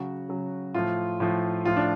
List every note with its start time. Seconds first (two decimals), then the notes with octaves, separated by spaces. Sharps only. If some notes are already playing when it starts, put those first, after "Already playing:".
Already playing: C#3 F#3 F#4
0.29 C#3 F#3
0.74 A2 F3 F4
1.20 A2 F3
1.65 A2 F3 F4
1.76 D4